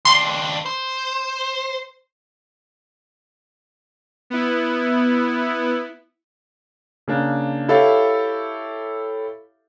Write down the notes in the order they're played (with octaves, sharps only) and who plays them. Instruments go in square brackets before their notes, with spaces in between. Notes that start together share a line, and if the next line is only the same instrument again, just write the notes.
[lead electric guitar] D#2 D4 [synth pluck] C6
[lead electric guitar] C5
[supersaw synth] B3 E4
[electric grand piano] C#3 A#3 D4
E4 G4 A4 C#5 E5 F5